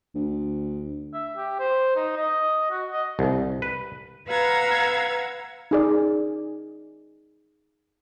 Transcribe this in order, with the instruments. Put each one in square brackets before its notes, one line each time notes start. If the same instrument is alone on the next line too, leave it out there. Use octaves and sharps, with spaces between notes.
[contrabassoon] D2
[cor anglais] E5
G4
C5
D#4
D#5
F#4
D#5
[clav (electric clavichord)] C2
B4
[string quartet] B4 F5 F#5 A#5 E6 G#6
[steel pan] D#4 G#4 D5